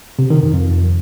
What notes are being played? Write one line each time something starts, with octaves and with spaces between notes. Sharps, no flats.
C3
D#3
F2
F2